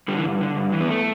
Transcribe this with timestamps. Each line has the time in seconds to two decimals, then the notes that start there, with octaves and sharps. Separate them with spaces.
0.08 D3 G3
0.17 E3
0.25 G2
0.41 D3
0.57 G2
0.72 E3
0.81 B3
0.89 A3